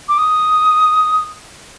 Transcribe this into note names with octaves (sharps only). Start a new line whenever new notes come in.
D6
D#6